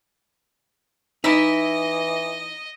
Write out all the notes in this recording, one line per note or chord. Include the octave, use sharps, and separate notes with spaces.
E3 D#4 E4 D#5 E5